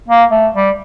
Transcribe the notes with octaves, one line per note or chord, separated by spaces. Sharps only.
A#3
A3
G3